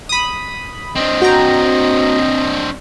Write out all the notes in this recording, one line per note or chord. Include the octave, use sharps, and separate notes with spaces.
B5 D#6
C4 D4 D#5
F#4 G5 A#5